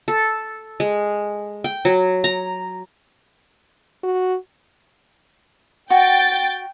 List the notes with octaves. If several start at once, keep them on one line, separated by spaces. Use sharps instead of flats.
A4
G#3
G5
F#3
A#5
F#4
F#4 G5 A6